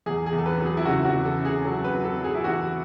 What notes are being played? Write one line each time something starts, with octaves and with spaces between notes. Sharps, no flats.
E2 G#4
G#4
E2
A4
B4
F#3
G#4
E4
C#3 F#4
F#4
E2
A4
C#3
G#4
F#3 A4
B4
F#3
A4
F#3
G#4
E4
E2 F#4